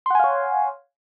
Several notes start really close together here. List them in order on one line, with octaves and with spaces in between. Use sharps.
C6 F#5 G#5 F5 C#5